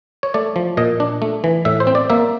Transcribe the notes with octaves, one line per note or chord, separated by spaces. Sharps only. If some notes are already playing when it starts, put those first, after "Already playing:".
C#5
A3 D5
F3
A#2 D#5
D4
A3
E3
A2 E5
C5
C4
D5
A#3 E5